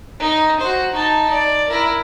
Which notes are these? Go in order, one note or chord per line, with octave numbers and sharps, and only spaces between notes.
D#4
F#4 C5
D#4 A5
D5
E4 A#4